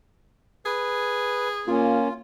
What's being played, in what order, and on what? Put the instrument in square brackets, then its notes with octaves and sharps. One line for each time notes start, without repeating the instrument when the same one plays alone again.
[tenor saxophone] G#4 [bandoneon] B4
[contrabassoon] A#2 [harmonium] A#3 C#4 [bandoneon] F4